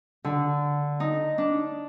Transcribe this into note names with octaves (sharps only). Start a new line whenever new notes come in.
D3
D#4
D4